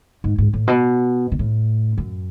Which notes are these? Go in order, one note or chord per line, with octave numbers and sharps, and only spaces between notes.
G#2
G#2
A2
B2
B2
A2
F#2